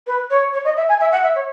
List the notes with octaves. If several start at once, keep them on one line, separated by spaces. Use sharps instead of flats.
B4
C#5
C#5
D#5
E5
G#5
E5
F#5
E5
C#5